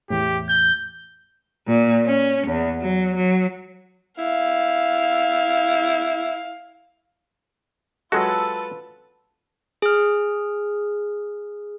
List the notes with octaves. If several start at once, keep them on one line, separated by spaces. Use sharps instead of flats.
E2 A2 G4
G6
A#2
C#4
E2
F#3
F#3
E4 F5
F#3 G#3 F4 F#4 A4 B4 A5 E6
G#4 F6